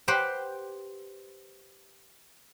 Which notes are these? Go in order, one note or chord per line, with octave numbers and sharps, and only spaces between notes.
G4 B4 C5 F#5 G5